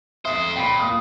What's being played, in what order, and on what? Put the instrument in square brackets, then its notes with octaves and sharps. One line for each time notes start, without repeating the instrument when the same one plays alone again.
[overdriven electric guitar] F2 C5 [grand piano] E5 D#6
[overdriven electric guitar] A#2 [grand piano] G5 B5
[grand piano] D#6